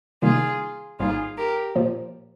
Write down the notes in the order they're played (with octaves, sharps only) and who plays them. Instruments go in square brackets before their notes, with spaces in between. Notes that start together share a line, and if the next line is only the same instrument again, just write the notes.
[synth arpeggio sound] C3 D#3 G3 A#3 D#4 [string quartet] F4 G#4
[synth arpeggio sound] G#1 G#2 G3 A#3 D#4 [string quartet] F4 G#4
[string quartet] G4 A#4
[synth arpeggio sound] A#2 F3 A#3 F4 C5